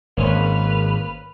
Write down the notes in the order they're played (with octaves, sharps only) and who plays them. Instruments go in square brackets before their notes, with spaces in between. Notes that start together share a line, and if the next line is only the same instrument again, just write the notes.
[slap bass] G#1 [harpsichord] A#3 C#4 C5 [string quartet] B4 F6